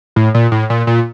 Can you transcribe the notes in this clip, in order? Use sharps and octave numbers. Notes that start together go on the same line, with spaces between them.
A2
A#2
A2
A#2
A#2